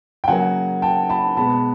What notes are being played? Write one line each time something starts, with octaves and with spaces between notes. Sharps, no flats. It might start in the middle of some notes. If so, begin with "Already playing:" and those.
G5
C#3 F#3 A#3 F#5 G#5
G5 A5
A5 B5
B2 G#3 B3 A5 B5